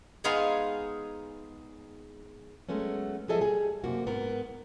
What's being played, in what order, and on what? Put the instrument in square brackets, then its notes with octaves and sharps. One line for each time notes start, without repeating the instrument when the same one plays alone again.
[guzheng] G#3 B3 D#4 G#4 F5 C6
[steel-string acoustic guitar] F#3 G#3 A3 B3 C#4
F3 F#3 G#4 A4 D#5 E5
G3 G#4
F#2 C3 A#3 F#4
G#2 B3 A#4